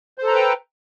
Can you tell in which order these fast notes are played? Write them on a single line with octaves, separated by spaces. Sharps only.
C5 A4 A#5 B4 G5